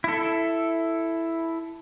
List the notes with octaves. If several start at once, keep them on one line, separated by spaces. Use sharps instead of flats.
E4 A4